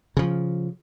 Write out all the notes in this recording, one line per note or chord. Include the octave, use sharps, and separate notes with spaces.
C#3 F3